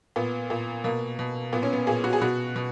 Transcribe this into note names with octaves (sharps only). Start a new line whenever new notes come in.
A#2 B3
A#2
B2 A#3
B2
A#2 B3
C#4
B3
A#2 G#4
F#4
G#4
B2 F#4
B2